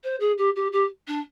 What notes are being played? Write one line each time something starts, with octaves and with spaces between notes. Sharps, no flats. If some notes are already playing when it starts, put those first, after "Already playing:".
C5
G#4
G4
G4
G4
D4